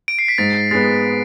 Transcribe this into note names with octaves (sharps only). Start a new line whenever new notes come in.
D7
C7
B6
G#2 A6
G#3 B3 A6